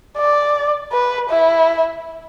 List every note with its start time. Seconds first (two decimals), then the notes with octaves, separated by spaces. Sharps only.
0.17 D5
0.92 B4
1.29 E4